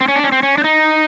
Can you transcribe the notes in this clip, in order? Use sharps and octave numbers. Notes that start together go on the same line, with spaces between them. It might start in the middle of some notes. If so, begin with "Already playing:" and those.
C4
C#4
D4
C#4
C4
C#4
D4
D#4